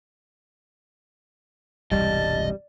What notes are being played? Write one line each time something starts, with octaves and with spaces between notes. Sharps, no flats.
E1 C2 G2 G3 D#5 A5